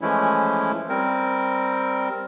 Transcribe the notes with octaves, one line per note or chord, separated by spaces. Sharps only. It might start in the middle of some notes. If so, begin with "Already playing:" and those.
E3 F3 G#3 A3 C#4 E4
G3 C4 A#4